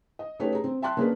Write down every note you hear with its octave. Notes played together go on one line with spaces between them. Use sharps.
D#5
A3 C#4 D#4 G4 B4 C#5
G#4 A#5
C4
E5 G5 A5 C6 F#6
A#3 C#4 D4 G#4 A#4 B4